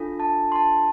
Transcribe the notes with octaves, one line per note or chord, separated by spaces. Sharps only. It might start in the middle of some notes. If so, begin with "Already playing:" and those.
Already playing: D4 F4 A4
A5
C6
A5